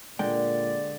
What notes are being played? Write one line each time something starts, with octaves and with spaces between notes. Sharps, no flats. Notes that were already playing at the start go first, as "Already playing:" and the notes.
A#2 D3 G#3 D5 G5